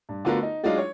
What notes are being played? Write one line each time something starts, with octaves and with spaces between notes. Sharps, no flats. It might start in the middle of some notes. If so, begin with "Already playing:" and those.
G2
D3 A3 B3 F4 F#4 A#4
D#4
F#3 G#3 D4 D#4 F4
C#5